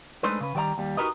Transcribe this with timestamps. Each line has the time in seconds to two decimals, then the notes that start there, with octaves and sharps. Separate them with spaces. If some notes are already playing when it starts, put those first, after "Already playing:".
0.23 G#3 A3 D4 D#4 B4 C5
0.41 C#3 B4
0.55 D#3 G3 D5 E5 A#5
0.78 D#2 G3
0.97 D#4 F#4 G4 A#4 B4 D#5